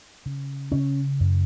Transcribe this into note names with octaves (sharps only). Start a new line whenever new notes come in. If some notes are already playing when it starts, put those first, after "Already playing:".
C#3
C#3 C#4
F#2